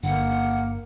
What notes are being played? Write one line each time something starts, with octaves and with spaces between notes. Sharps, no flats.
G1 D3 A#3 F#5